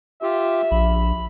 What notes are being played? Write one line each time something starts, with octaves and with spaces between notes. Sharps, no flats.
F4 G4 E5
A#1 B5